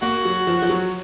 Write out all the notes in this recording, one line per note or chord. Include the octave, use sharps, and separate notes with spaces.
A#3 F#4
F#3
F3
F3
F#3